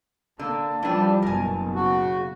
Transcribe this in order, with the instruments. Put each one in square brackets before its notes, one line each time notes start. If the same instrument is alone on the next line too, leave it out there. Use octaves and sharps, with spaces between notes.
[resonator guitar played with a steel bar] D3 [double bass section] A#3 [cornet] A5
[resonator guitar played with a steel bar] E3 D4 [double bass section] F3 G3
[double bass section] F#1 B2 [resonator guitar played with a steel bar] A#4 G#5
[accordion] C#3 F#4